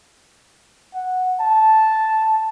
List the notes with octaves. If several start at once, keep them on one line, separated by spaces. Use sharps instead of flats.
F#5
A5